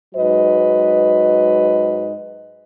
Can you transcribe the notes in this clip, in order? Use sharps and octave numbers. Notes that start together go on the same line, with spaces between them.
G#2 F#3 B4 D#5